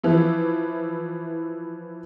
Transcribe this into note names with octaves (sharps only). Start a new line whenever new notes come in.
E3 F3 E4